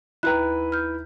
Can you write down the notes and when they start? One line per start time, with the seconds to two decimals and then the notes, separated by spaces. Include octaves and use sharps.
0.23 D#2 E4 B4 A#5 F#6
0.72 F6 G6